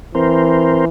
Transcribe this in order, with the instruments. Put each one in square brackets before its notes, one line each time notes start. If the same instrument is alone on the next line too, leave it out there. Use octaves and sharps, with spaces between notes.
[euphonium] E3 [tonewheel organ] C4 A#4 C5